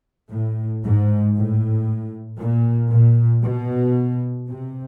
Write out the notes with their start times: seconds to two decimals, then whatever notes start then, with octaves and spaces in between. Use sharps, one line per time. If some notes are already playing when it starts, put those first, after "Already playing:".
0.30 A2
0.82 G#2
1.35 A2
2.38 A#2
2.91 A#2
3.44 B2
4.48 C3